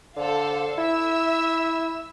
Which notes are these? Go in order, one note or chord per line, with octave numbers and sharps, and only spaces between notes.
D3 A4 C5 F5
E4 E5 E6